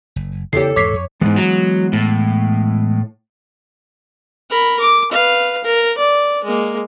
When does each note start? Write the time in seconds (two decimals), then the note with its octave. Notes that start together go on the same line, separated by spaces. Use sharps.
0.16 F#1
0.53 E2 C#3 A#3 B3 G4 A4 C#5 C7
0.76 E2 G#2 E3 C#5 D6 B6 C7
0.93 F2
1.21 E2 G#2 E3 G#3 B3
1.36 F#3
1.93 A2
4.50 A#4 B5
4.80 D6
5.12 B4 F5
5.64 A#4
5.97 D5
6.44 G#3 A#3